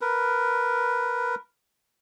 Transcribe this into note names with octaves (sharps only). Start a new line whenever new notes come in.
A#4 B4